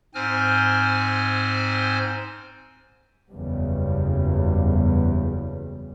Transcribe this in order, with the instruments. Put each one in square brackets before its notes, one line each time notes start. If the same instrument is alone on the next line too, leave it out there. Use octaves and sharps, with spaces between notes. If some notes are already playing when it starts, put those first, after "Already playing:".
[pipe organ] G#2 C4 C5 G#5 F6
[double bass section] F#1 E2 C#3 G3 B3